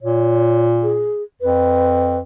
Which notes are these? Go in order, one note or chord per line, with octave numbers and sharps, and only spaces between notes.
A#2 C#5
G#4
F2 B4